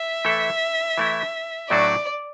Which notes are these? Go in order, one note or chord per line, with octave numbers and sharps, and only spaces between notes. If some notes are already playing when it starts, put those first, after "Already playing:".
Already playing: E5
E3 A3 E4 A4
E3 A3 E4
A2 F#3 A3 D4 F#4 D5